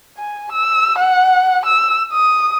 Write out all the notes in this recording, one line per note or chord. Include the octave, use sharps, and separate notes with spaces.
G#5
E6
F#5
E6
D#6